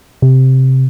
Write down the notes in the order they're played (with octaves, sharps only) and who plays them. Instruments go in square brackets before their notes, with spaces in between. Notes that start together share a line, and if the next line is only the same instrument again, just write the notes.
[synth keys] C3